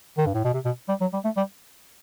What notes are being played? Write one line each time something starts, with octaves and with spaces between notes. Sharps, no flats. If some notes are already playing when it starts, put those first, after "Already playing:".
D#3
G2
A2
B2
C3
B2
G3
F#3
G3
A3
G3